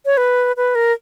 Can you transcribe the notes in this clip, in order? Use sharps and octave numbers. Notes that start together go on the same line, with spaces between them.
C#5
B4
B4
A#4